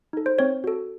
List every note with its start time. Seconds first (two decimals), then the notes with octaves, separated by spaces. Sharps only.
0.13 D#4 A4
0.26 C5
0.39 C4 C#5
0.64 F#4 A4